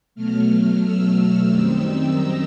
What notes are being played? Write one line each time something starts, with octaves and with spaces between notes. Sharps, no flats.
B2 F#3 A3 F6
E6
F#2 D#3 G3 C4 D#4 E6
A#5